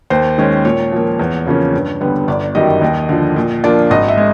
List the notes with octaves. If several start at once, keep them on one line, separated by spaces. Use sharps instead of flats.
D#2 C5
D#3 G#3 C#4
A#2 C#5
F3 A#3
E2
C#3 F3 A#3 C#4
G2
D3 G3 B3
G1 D5
F#2 D#3 G3 D#5
D#2
D3 F3
A#2
F3 A#3 D4 F4
G#1 D#5
E5
G#3